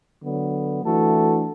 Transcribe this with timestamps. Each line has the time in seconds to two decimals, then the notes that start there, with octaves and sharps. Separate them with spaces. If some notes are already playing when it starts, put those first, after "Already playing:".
0.21 D3 F#3 B3
0.83 E3 A3 D4 F#4 A4